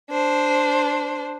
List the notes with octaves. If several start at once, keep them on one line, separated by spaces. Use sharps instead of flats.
D4 C5